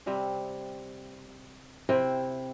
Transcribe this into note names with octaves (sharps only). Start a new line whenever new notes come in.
C3 G3 C4 E5
C3 E4 C5 G5